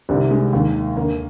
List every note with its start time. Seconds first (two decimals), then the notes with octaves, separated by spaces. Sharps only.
0.09 C2 C3 D#3 G3
0.31 G#3
0.53 D#2 D#3
0.97 D#2 D3 A#3